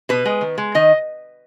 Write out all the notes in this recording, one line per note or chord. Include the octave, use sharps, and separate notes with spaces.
B2 B4
G#3
D#3
G#3
D#3 D#5